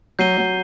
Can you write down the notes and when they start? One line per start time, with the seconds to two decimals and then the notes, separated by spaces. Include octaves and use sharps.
0.19 F#3 G6 C7 D#7 G7
0.37 F#3